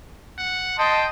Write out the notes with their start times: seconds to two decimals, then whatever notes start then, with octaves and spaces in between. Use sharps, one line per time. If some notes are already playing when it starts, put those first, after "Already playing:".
0.39 F#5
0.79 D#5 G5 A5 C6